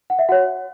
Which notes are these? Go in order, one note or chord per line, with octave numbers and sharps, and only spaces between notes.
F#5
E5
F#4 C#5 F#5